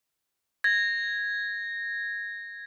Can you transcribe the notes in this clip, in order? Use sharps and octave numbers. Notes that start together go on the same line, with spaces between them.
G#6 A#6